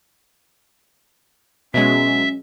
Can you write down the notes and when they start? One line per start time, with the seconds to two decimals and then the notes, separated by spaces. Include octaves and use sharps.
1.74 B2 F#3 G#3 C#4 E5